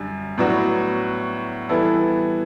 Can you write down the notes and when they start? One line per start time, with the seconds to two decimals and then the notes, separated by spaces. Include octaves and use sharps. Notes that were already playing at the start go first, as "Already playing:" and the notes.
Already playing: F#2 D3 G3
0.38 A2 F#3 B3 D4 F#4
1.69 E3 G3 B3 E4 A4